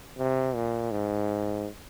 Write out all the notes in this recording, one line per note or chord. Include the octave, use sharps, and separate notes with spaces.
C3
A#2
G#2